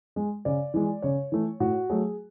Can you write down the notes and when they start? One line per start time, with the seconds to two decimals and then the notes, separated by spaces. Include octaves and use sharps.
0.16 G#3
0.45 C#3 D5
0.74 E3 G#3
1.02 C#3 C#5
1.32 E3 A3
1.60 A2 F#4
1.90 F#3 A3 G#4